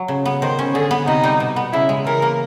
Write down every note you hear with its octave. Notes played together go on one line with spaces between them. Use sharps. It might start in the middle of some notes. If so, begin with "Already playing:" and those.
Already playing: F#3
C#3
B3
D#3 C5
C#4
D3 G#4
B3
C3 D#4
G3
B2
B3
C#3 E4
G#3
E3 A#4
A#3